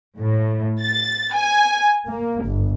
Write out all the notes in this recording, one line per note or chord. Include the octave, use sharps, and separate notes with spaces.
A2
A6
G#5
A#3
G1